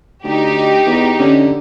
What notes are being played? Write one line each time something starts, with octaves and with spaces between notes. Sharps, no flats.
D2 D#4 G4
E2
D3 C#4